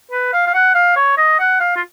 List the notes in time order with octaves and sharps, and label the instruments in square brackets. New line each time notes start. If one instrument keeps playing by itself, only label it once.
[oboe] B4
F5
F5
F#5
F5
C#5
D#5
F#5
F5
F4